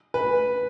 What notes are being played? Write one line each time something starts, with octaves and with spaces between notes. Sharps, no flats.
B4